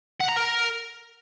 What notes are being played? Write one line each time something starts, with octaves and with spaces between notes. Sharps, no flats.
F#5
A#5
A#4